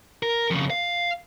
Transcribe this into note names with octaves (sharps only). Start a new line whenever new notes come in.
A#4
F2 C#3
F5